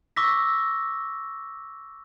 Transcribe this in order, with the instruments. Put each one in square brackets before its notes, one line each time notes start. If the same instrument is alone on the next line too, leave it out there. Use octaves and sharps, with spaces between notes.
[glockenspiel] C#6 D6 E6 A#6 B6